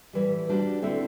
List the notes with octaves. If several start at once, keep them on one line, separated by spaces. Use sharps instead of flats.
A2 E3 G3
G3 D4 F#4 C5
D3 A3 C4 E4 A4